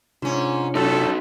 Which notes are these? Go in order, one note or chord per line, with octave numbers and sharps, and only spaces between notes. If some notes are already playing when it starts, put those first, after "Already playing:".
G#2 C3 C#4 D4 F4
F#2 A3 D#4 F#4 A4